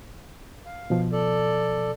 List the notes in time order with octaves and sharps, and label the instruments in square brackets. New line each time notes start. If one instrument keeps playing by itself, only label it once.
[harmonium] F5
[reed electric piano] B2 F3
[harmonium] A4 D5